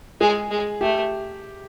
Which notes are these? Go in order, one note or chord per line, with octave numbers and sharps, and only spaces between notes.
G#3 G#4
G#3
A3 G4